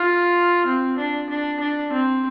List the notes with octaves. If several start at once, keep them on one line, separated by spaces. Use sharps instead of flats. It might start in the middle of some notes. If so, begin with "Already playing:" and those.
Already playing: F4
C4
D4
D4
D4
C4